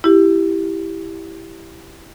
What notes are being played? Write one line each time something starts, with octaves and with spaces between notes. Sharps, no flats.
E4 G4